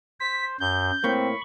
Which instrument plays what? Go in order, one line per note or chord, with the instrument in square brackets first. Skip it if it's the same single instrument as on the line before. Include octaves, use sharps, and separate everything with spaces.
[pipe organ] C5 [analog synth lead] B6
[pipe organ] F#2 [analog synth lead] G6
[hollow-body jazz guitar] A2 A#3 [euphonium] C4 [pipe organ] B5 C#6